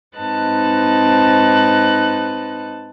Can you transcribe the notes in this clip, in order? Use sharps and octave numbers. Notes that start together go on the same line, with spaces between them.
G#2 C4 D#4 B4 A5 F#6